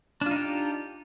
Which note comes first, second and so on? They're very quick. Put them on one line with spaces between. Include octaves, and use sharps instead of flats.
D4 F4 D#4 G4